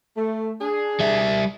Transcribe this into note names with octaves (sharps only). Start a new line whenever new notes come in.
A3
D4 G#4
G3 E5